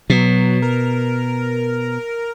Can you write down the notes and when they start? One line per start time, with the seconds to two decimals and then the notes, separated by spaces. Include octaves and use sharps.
0.10 B2 F#3
0.62 A#4